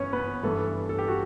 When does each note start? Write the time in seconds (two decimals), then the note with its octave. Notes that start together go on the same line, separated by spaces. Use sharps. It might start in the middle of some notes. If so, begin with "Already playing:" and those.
Already playing: G1 F#2 E3 B3 C#4 C#5
0.13 B3 B4
0.43 G2 E3 A3 B3 A4
0.89 A4
0.98 G4
1.08 F#4